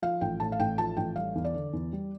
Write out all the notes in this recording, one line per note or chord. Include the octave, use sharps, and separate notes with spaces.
F3 F5
A1 G5
A2 A5
F5
A1 G5
F3 A5
A1 G5
G3 F5
E2
D5
D3
E2
G3